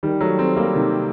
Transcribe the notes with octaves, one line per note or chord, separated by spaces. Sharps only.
D#3 G3
F#3 A3
A3 C4
G3 A#3
C3 D#3